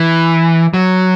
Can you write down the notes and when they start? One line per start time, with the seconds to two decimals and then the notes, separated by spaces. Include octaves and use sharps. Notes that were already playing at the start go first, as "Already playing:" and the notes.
Already playing: E3
0.74 F#3